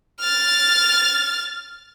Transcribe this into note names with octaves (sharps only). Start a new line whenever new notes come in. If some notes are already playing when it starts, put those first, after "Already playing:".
F6 A6